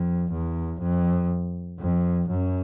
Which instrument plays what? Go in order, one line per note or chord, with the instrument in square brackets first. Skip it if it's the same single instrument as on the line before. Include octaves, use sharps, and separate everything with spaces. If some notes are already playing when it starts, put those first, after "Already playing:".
Already playing: [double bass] F2
E2
F2
F2
F#2